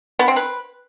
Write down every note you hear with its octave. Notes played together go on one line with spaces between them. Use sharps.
B3
C4
B4